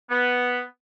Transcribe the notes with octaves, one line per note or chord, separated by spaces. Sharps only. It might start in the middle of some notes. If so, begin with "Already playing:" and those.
B3